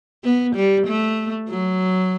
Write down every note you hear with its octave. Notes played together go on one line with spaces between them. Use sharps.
B3
G3
A3
F#3